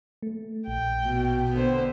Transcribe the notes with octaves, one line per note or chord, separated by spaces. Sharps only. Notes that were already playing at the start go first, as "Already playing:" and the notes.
A3
A#1 G5
B2
D3 B3 C5